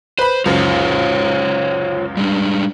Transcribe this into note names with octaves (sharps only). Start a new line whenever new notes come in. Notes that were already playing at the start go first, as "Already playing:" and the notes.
B4 C5 B5
C#2 F#2 F4 C5 C#5
G3 G#3 D4